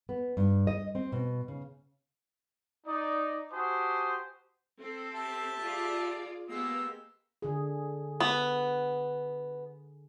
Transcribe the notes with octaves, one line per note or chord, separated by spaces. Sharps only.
B3
G2
D#5
C4
B2
C#3
D#4 D5
F#4 G4 C5 G#5 A5 D#6
C4 A4
G4 E5 A5
F4 G#4 D5
G#3 A#3 B3 G4 E6
D3 G#4
B3